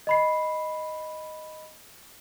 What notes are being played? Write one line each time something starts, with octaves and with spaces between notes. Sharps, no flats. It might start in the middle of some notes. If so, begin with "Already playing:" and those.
D#5 B5 C7